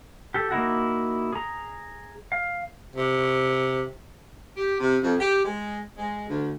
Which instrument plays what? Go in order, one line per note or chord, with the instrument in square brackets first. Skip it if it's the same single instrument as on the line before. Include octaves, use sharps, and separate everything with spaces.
[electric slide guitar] G4 A4
A#3 D#4 E4 F#4
G#4 A#5
F5
[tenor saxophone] C3
[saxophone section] G4
C3
F2
G4
G#3
G#3
D2